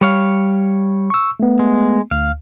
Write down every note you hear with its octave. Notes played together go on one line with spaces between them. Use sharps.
G3 C#5 F5
C#6 E6
A3 B3
G#3
D2 F5